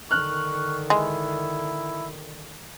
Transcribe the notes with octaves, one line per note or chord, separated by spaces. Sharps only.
D3 D#3 C#6 F6 F#6
G#3 E4